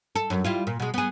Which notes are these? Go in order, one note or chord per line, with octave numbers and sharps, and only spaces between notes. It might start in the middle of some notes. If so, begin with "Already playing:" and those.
A4
F#2
G3 E4 F4
A#2
B2 G#3
B3 G#4